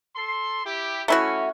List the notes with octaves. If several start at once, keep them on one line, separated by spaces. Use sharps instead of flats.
A4 C6
E4 G4
A3 C#4 E4 F#4